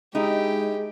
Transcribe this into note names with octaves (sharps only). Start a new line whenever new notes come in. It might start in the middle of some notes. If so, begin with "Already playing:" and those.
G#3 D#4 E4 G4